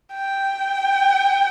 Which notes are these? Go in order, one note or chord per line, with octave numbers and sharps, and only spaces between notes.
G5